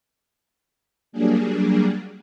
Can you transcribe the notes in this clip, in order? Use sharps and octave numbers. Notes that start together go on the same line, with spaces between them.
F#3 G3 A#3 D4 G#4